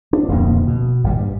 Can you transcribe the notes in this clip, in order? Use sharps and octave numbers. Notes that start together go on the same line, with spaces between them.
D4
D1 F2 B2 A#3
B2
G#1 A#2 G3
G2